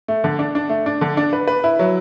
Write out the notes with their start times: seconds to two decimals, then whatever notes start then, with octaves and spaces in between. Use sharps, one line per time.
0.08 A3
0.24 D3
0.39 D4
0.55 D4
0.69 A3
0.86 D4
1.01 D3
1.17 D4
1.33 B4
1.47 B4
1.64 E4
1.79 F#3